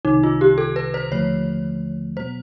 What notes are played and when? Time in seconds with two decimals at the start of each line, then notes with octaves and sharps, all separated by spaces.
0.05 C2 C3 D#3 D#4
0.23 F4
0.41 G4
0.58 A4
0.76 B4
0.94 C5
1.11 D#2 D3 F3 A3 C#5
2.17 B2 F#3 B3 C5